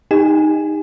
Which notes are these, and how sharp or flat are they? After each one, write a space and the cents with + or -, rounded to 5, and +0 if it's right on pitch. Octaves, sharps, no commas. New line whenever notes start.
D#4 +0 G4 +40 G#5 +0